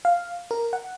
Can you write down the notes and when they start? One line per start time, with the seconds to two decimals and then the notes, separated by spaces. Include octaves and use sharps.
0.05 F5
0.51 A#4
0.73 F#5